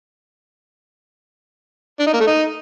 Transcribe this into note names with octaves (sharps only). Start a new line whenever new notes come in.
D4
D#4
A#3
A3
D#4